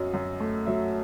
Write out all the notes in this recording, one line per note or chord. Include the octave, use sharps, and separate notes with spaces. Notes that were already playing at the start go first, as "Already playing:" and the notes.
Already playing: F#2 F#3 D#5
F#2
A3
F#3 E5